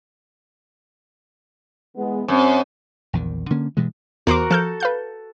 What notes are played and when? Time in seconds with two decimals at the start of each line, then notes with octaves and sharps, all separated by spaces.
1.97 E3 G#3 B3
2.28 F#2 C4
3.13 A#1 E2 D#3
3.50 D3 A#3 C#4
3.77 G2 B2 E3 G#3
4.27 E2 F#4 A#4 C5 D6
4.50 F3 A4 F6 G6
4.80 B4 F5 G6